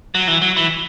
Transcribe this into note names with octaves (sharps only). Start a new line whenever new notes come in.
F#3
E3
F#3
E3